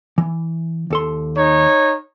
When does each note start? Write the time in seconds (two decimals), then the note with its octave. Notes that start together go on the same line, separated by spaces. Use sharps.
0.18 E3
0.90 D#2 A4 C6
1.37 D#4 C#5